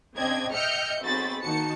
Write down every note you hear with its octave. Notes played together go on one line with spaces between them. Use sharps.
C#3 C4 D4 D#5 G5 G#6
D#5 E5 G5 F6 G6 C#7
B1 C4 F#4 G#4 B5 A6
D#3 A#3 D#4 F#4 A5 C#7